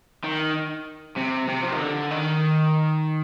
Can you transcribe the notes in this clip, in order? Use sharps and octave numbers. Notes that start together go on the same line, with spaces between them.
D#3
C3
C3
F3
D#3
D3
D#3